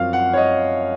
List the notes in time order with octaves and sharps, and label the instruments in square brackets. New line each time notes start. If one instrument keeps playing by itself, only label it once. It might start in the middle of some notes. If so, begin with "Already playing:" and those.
Already playing: [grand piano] F#2 F3 C4 F5
F#5
C#5
D#5